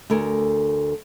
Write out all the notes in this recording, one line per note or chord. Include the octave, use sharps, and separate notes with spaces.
D2 A4 A#4 G#5